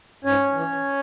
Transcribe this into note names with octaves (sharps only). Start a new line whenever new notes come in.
G#2 C#4 C#5
E3